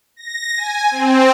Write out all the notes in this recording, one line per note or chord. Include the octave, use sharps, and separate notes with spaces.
A#6
G#5
C4